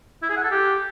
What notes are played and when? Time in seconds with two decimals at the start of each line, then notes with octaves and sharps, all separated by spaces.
0.23 E4
0.30 G#4
0.37 F#5
0.44 A4
0.51 G4